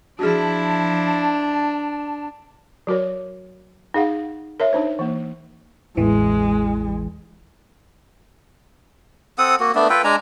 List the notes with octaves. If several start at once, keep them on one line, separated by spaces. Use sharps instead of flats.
F3 D4 E4 F#4 G#4 A5
F#3 F#4 A#4 C#5
D#4 G#4 F5 F#5
A#4 C#5 E5
D4 D#4 C5
E3 A#3
A1 E2 E3 G#3
C4 A4 F#5 D#6
A#3 F#4
A3 B3 D4
F4 A4 B4 G5
G#3 D4 G#5 A#5